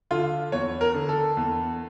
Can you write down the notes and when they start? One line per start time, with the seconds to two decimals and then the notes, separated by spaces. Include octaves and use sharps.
0.11 D3 F4
0.52 E2 C#5
0.81 A#4
0.94 D3
1.09 A4
1.37 E2